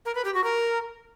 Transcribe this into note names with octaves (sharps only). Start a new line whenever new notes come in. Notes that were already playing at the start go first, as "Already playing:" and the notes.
A#4
B4
G4
F#4
A#4